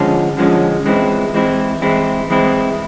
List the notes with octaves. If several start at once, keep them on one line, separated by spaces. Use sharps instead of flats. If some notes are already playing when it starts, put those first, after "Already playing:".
Already playing: D3 F3 G#3 C#4
D3 F3 G#3 C#4
E3 G#3 C4 E4
E3 G#3 C4 E4
E3 G#3 C4 E4
E3 G#3 C4 E4